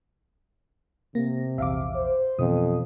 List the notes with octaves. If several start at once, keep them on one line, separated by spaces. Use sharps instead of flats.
C3 A#3
A#1 E2 E5 F5 D6
C5
F2 B2 E3 B3 D#6